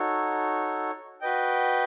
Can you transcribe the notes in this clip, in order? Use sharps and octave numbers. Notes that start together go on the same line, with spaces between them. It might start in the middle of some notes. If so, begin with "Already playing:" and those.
Already playing: D#4 F#4 A4 C#5
F#4 B4 D#5 G5